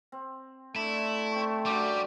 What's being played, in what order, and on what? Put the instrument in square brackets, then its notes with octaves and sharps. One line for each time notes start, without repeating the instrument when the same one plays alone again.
[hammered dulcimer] C4
[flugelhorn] A3 [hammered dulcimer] D4 [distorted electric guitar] E4
[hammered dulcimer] C4 G5 C#6
[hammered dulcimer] F#2 D3 F#4 [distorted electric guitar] G3 [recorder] D6